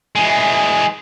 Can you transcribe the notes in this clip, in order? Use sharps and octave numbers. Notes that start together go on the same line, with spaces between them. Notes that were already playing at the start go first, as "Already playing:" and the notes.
E3 G#3